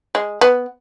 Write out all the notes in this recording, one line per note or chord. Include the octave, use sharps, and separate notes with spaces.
G#3
B3